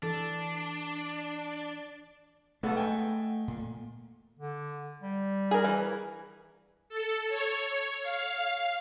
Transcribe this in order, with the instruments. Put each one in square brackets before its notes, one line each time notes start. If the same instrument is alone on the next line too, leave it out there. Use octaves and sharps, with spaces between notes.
[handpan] E3 A4 [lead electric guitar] D4
[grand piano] B1 G#3 B3 [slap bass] A3 [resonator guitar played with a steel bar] A4 F#5
[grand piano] D#5 G5 G#5
[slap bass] A#2
[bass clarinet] D3
G3
[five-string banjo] G#4 A#4
E3
[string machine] A4
C#5
F5